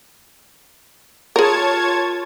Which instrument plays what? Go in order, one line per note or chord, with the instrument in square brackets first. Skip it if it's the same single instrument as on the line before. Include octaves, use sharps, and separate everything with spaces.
[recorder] F4 [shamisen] G#4 A#4 [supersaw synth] C#5 A5 G#6